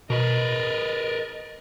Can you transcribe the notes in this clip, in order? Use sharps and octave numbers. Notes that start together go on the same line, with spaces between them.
B2 A#4 B4 D#5 A6